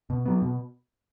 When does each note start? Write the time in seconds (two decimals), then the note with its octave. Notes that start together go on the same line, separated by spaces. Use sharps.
0.10 B2
0.26 F#3 B3
0.42 B2